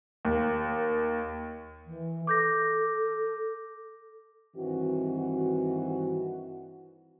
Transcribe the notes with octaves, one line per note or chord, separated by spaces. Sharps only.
D#2
E3
A4 D6 G6 A#6
G2 D#3 E3 C4 F#4